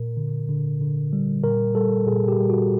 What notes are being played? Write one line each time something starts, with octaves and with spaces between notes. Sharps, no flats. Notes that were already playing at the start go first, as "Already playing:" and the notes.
Already playing: A#2 A#4
D3
D3
D3
G3
A#2 A#4
G3 A4
A#2 G#4
G4
G3
F#4